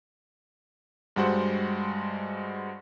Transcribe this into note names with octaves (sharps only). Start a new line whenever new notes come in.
G2 G3 G#3 F#4 C5 F#5